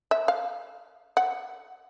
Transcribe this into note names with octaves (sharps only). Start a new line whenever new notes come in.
E5
F5
F#5